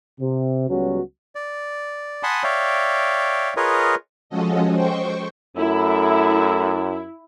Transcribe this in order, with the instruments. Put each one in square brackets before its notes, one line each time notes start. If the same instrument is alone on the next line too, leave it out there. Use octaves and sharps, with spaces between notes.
[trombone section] C3
C#2 F#3 G3 B3 C#4 F#4
[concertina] D5
F#5 G#5 A5 B5 C6 D#6
C#5 D5 E5 F5 G5
F4 G#4 A#4 B4 C#5 D#5
[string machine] F3 G#3 C#4 F#4 A4 D#5
C5 G5 C#6
[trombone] F#2 [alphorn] A3 [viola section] E4